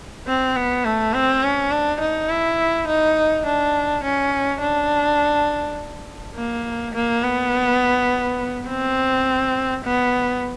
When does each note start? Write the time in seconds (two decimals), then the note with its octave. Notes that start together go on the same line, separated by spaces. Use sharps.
0.27 C4
0.56 B3
0.85 A3
1.14 C4
1.43 C#4
1.71 D4
2.00 D#4
2.30 E4
2.88 D#4
3.46 D4
4.04 C#4
4.62 D4
6.36 A#3
6.94 A#3
7.24 B3
8.69 C4
9.85 B3